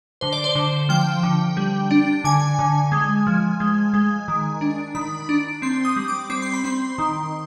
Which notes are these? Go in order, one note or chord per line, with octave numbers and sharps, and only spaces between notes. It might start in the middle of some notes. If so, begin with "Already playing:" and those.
D3 C5
D5
C5
D3
F3 G5
D3
G3
D4
D3 G#5
D3
G#3
F3
G#3
G#3
D#3
D4
D#3 B5
D4
C4 C6
D#6
G3
D6
C4 D6
C6
B5
C4 C6
D#3